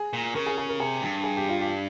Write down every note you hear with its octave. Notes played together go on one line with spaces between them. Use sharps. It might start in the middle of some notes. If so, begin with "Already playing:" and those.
Already playing: G#4
A#2
C#3 A#4
G#4
G#4
A#4
C3 G#4
G2
G#4
G4
F4
G4